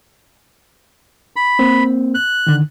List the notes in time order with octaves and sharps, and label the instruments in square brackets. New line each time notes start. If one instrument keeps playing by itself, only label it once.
[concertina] B5
[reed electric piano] A#3 C4
[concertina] F#6
[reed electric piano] D3 D#3